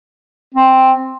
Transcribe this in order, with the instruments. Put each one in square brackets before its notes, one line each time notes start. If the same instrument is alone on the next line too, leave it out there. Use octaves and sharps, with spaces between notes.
[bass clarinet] C4